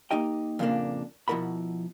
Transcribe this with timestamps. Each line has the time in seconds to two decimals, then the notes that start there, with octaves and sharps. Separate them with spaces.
0.11 A#3 D#4 G4 D#5 G5
0.59 F2 A#2 C#3 F3 A#3 D4
1.28 B2 F3 E4 A#4 F#5 B5